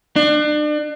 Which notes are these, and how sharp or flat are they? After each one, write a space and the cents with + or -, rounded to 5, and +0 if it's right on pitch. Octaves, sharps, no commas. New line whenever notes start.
D4 +35